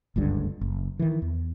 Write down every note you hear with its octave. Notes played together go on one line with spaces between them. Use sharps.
F#1 C#2 G2 D3
F#1
D#3 E3
E2